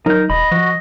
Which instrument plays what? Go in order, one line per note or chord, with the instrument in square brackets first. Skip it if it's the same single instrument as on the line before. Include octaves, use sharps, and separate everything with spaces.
[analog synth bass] F#3 [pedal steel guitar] D#4 G6 [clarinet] A#4
[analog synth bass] E1 [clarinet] D#5 [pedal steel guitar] B5
[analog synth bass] F3 [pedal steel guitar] F#4